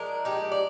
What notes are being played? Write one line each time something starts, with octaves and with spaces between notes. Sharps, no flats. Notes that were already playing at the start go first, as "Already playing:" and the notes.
Already playing: F3 G#3 D4 A#4
D#4 G4
D5